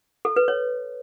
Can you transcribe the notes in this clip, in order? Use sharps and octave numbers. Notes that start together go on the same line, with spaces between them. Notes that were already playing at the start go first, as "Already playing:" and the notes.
A4
B4
C#5